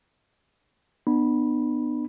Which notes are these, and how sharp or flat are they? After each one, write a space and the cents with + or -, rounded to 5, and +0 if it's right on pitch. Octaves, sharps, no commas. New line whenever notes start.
B3 +0 D4 +45 B5 -15